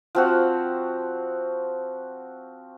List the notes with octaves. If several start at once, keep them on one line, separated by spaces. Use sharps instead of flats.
F3 C4 F#4